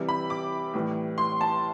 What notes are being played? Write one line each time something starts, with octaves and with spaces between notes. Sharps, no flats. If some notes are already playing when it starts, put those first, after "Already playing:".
Already playing: C3 E3 G3
B5
D6
A2 E3 G3
C6
A5